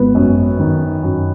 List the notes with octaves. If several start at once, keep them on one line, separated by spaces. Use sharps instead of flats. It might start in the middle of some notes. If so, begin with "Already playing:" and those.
Already playing: G#1 B3
F#2
D#3
F#2